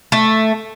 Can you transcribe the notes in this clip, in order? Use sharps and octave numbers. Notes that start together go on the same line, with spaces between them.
A3